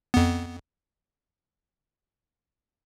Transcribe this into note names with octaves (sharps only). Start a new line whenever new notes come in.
F2 B3